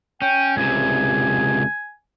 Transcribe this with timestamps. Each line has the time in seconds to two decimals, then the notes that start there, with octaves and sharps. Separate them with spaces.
0.22 C#4 G5
0.57 C#2 C3 G#5